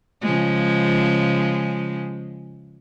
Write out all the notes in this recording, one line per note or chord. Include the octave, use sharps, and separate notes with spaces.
C#3 F3 G#3